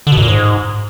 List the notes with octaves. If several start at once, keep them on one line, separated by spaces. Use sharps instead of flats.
D3
B2
F#2
A#2
G#2